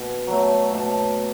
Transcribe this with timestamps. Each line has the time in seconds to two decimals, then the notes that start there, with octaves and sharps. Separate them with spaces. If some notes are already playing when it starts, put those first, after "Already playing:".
Already playing: B2
0.27 F#3 A3
0.73 B2 A5